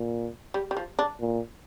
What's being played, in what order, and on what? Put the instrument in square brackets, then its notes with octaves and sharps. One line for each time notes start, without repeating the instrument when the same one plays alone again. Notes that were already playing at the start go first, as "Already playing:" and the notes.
Already playing: [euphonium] A#2
[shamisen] G3
G3
F3
D4
[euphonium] A#2